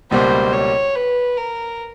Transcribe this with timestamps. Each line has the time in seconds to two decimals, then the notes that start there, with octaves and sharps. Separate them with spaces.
0.11 C#2 B2 G3 A#3 C5
0.53 C#5
0.95 B4
1.37 A#4